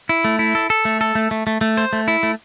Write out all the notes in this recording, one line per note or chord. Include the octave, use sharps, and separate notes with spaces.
E4
A3
E4
A4
A4
A3
A4
A3
A3
A3
A3
C5
A3
E4
A3